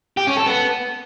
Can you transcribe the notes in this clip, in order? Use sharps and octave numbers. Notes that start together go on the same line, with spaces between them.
G4
C#4
A4
B3